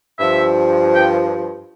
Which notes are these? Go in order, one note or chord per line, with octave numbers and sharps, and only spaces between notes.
G2 F3 E5
G5